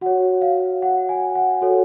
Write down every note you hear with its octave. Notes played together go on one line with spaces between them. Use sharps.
F#4 C#5 F#5
F5
F#5
G#5
F#5
F#4 A4 C#5